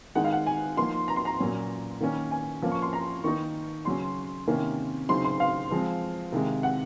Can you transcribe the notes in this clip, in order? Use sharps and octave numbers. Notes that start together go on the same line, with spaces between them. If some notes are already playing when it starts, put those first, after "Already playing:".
D#3 G#3 D#4 F#5
F5
F#5
G#5
F3 A#3 D#4 C6
A#5
C6
A#5
A#2 F#3 C#4
D#3 A#3 C#4
G#5
F3 A#3 C#4
C#6
C6
A#5
D#3 A#3 D#4 C#6
C#3 F#3 C#4 C6
C3 D#3 A#3 C#4
C#3 F#3 C4 D#4 C6
C6
F5
F3 G#3 C4
C3 D#3 G#3
F#5